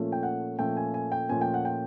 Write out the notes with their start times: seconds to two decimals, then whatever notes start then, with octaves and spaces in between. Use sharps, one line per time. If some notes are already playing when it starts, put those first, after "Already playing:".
Already playing: A#2 F3 A3 C#4
0.12 G5
0.23 F#5
0.59 A#2 F3 A3 C#4 G5
0.77 G#5
0.94 G#5
1.12 G5
1.29 A#2 F3 A3 C#4 G#5
1.41 G5
1.54 F#5
1.65 G5